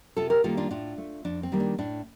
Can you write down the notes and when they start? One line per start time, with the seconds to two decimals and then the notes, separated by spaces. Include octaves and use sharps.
0.17 C3 F4 A4
0.30 G4 A#4
0.44 D#3 G3 A#3 F4 A4
0.57 D4 F4
0.70 A2 D4 F4
0.98 A3
1.25 F2 D4
1.43 C4
1.52 D#3 G3 A#3
1.60 D4
1.78 A2 D4